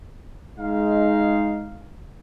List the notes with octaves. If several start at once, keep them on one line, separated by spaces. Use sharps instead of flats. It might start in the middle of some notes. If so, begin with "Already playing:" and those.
G#3 D#4 F5